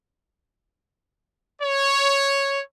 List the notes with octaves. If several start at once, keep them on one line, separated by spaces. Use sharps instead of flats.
C#5